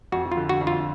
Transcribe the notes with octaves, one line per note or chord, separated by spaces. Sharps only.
F2 F#4
F4
D3
F#4
F2
F4